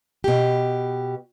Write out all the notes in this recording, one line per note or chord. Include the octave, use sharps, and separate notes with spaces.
B2 G4